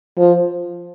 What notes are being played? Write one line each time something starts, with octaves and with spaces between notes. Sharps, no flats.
F3